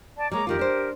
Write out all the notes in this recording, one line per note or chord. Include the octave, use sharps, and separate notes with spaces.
D5 A5
G3 G#3 A#3 C#5 A#5 D6
F2 D#3 F4 G4 A#4
D4 C5